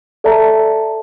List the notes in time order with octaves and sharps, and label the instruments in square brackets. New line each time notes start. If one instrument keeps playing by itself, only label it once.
[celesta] A4 D5 E5 A5 A#5